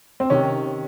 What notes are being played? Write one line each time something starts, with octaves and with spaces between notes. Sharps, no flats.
C4
C3 D#3 C#4